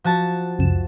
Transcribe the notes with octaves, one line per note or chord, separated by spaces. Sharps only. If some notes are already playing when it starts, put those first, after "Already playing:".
F3 F#4 A5
C#2 F#2 E7